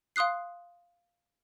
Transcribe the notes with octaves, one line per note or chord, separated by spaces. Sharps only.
F5 C6 D#6 F#6 C7